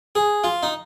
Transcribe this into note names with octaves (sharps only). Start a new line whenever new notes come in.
G#4
F4
D#4